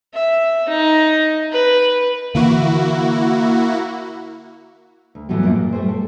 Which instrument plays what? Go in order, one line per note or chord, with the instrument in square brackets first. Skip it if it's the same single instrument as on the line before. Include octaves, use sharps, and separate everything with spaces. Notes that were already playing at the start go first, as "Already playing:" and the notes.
[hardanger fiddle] E5
D#4
B4
[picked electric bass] D3 E3 [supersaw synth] A#3 E4 F#4
[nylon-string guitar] D2
A2 E3 F#3 G3 B3
F#2 A#3 D4 F4 D5
A#2
G3 A3 C5
A4